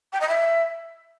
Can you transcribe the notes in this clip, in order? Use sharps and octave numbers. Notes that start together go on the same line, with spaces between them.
G5
D#5
E5